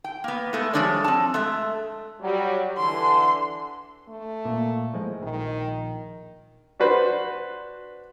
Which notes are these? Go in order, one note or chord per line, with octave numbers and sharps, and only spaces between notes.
G5
A#3 B3
G#3 A3 B3
F3 G3 G#3 D4 C#5 D5
C4 A5
G#3 A3 E5
F#3 G3
D3 E3 C6
A3
A#2 A#3
A2 F3 G#3
A#1 D#3
D4 F#4 B4 C5